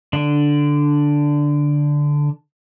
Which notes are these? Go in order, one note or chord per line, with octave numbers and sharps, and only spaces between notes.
D3 D4